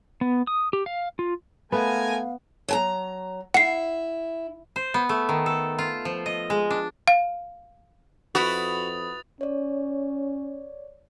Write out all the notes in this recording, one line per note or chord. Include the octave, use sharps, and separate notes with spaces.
B3
D#6
G4
F5
F4
G#3 A3 B3 A#4 F5 G#5
F#3 G#5 A#5
E4 F#5 C7
C5
B3
A3
D#3
A4
F4
F3
D#5
G#3
D4
F5
F2 E4 F#4 B4 D#6 A6 F7
C#4 C#5 D5